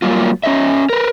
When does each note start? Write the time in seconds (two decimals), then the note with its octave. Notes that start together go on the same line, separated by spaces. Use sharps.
0.02 F#3 G3 A#3 F4
0.43 C#4 G4 D#5 E5
0.90 A#4 B4